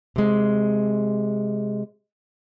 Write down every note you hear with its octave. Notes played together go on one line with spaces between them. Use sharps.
C3 G#3